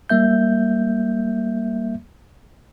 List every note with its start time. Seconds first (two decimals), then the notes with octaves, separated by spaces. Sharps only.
0.10 G3 A#3 E5 G6